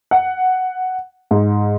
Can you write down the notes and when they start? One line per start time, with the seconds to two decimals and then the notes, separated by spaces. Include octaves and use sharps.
0.11 F#5
1.31 G#2